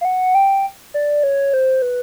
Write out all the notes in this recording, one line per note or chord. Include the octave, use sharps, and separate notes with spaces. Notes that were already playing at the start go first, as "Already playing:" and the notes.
F5
F#5
G5
D5
C#5
C5
B4